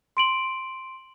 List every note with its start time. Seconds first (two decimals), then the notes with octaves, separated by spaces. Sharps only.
0.17 C6 D7 F#7